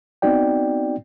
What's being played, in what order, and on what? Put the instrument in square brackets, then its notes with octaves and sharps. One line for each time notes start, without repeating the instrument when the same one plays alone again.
[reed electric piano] B3 C4 D#4 F#4 D5 G5